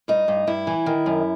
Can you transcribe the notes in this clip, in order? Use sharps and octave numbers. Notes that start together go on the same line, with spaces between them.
G2 D#4
G2
G2 E4
E3
D#3
F#2